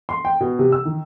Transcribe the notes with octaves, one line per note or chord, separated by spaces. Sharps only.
C6
G5
B2
C3
E6
D#3